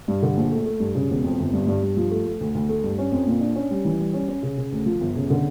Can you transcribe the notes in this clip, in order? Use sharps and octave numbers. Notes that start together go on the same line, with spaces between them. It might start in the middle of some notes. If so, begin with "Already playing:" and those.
G2
D3
A#1
A3
A3
G2
C#3
E1
F2
G1
G2
G2
G2
F3
A3
A3
D2
D2
A3
G2
C#4
F2
A#2
D4
C#4
G3
E3
G3
C#4
C#4
C#3
C#3
D2
F3
G1
C#3
D3